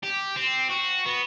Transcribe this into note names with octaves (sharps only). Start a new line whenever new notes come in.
G4
C4
F#4
B3